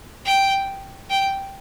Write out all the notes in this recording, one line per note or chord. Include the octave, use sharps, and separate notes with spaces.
G5
G5